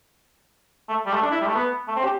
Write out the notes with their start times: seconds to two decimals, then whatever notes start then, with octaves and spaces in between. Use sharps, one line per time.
0.89 A3
1.06 G3
1.14 A3
1.22 D4
1.31 E4
1.41 G3
1.47 A3
1.55 B3
1.88 A3
1.96 C4
2.04 G4